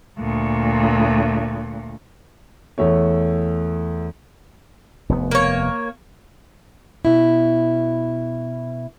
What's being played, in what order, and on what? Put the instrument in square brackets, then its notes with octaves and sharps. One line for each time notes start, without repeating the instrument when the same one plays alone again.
[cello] D2 A#2
[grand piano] E2 A3 C#5
[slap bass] F1 D#2 B3
[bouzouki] A#3 C#5
[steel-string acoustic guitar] B2 E4